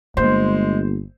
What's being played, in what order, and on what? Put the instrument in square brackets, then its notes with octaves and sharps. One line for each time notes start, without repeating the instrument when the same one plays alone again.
[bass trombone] G1 [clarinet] G#3 [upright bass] A#3 [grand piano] C5